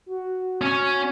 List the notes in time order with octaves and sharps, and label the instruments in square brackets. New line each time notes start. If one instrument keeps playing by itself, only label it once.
[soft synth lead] F#4
[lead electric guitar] C#4 C#5